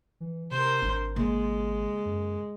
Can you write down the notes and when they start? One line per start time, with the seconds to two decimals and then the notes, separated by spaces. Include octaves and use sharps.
0.20 E3
0.51 C3 A#4 C5
0.82 G#1 D4
1.16 C#3 G#3 A#3
2.05 F#2